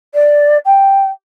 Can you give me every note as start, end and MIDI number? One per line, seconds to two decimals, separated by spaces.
0.14 0.58 74
0.65 1.10 79